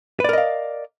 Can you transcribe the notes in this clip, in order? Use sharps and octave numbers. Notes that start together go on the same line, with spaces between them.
A#4 B4 D5 D#5 F5